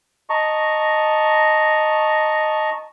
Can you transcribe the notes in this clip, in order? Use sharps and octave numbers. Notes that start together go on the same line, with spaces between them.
D#5 A5 A#5 C#6